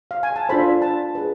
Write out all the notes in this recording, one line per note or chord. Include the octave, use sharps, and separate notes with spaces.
F5
G#5
A5
D4 F4 A4 C5 B5
A5
G#4 B4